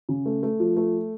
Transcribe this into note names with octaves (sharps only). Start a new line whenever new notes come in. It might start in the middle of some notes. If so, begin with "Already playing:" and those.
C#3
A3
A3
F3
A3